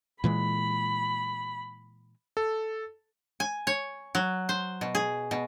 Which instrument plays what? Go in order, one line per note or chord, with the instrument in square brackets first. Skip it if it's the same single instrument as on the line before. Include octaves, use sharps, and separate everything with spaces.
[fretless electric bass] A#2 E3 G#3 [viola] B5
[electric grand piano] A4
[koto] G#5
C#5
F#3
C5
B2
G#4
B2